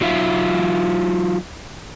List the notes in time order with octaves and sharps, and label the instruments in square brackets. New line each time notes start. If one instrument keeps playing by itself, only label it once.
[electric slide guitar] F#3 D#4 F4 C#5 E5 F5